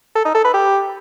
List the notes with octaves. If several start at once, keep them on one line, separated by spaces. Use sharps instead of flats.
A4
D#4
A4
B4
G4